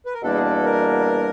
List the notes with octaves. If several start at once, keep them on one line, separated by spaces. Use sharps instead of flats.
B4
A#4
E2 B2 G3 A#3 D4 A4
G#4
A4
A#4